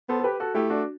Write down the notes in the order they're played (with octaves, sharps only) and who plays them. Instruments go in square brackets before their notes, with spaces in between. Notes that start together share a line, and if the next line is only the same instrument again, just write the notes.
[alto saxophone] B3 [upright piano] A4 C5
[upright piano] A4
G4 B4
F#4 A4
[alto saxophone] A3 [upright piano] E4 G4
[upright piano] D4 F#4